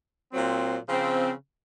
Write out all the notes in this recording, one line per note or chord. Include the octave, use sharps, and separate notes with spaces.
A#2 F#3 C4
C#3 F3 C4